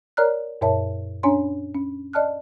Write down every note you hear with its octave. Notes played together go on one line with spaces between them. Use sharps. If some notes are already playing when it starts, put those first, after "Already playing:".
A#4 C#5 D5 A#5 F6 F#6
F#2 A#2 A#4 C#5 E5 A5
C#4 D4 C#5 G#5 A#5 C6
C#4
D5 D#5 A5 F6 F#6